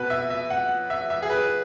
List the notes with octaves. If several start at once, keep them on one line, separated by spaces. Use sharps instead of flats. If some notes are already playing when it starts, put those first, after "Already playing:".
Already playing: B2 B3 B4
E5
E5
F#5
E5
E5
G#4
B4